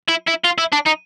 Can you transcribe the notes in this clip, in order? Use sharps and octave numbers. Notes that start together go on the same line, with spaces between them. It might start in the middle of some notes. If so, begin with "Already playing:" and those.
E4
E4
F4
E4
D4
D#4